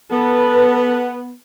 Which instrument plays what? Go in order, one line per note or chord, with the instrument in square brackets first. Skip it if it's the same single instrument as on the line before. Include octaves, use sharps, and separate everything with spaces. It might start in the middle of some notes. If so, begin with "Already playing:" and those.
[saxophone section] B3 [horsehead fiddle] A4 B4